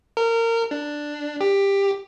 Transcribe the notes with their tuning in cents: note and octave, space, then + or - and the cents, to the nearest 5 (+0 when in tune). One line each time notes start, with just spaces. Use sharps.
A#4 -25
D4 +5
G4 +15